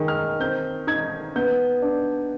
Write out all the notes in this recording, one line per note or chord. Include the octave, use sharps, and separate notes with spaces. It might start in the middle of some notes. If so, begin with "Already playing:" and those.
Already playing: D#3 G#3
F6
C4 G6
D#4 G#6
B3 G6
D4